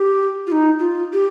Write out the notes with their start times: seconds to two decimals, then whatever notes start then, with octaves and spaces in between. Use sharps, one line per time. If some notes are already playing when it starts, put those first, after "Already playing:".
Already playing: G4
0.47 F4
0.52 D#4
0.79 F4
1.13 G4